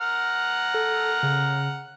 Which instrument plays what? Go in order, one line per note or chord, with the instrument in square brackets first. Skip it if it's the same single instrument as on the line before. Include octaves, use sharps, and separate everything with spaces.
[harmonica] F#5 A#5 F6
[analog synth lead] A4
C#3